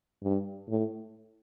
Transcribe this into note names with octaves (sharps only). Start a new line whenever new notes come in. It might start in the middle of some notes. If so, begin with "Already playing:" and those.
G2
A2